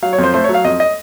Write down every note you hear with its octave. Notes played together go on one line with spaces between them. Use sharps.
F#3 F5
C#5
F2
C5
A3 C5
C#5
F#3
F5
F2 D#5
D#5